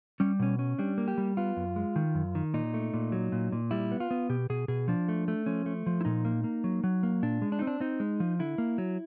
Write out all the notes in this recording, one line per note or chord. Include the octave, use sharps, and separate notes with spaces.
G3 C#4
B2 C#4
C#4
G3 D4
A#3
G4
G3
B3 F4
F#2
G#3
D#3
F#2
D#3
A#2 D#4
A3
A#2
F#3
A#2
A#2
G3 E4
B3
F4
B3
B2 G4
B2 G#4
B2 G#4
F3 D4
A3
A3
F3 C#4
A3
F3
E4
A#2 D#4
A#3
A#3
F#3
F#3
A#3
A#2 D4
G#3
D4
C4 D#4
D4
C4 D#4
G#3
F3
D3 E4
A#3
F#3